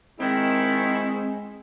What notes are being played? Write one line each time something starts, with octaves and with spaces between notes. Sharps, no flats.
D#3 G#3 C4 E4